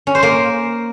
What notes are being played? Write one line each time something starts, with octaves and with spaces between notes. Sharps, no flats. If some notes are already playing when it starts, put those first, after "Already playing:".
C#4
C5
A#3